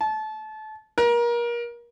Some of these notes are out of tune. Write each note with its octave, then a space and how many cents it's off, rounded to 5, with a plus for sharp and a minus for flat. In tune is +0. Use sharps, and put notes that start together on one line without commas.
A5 -25
A#4 +30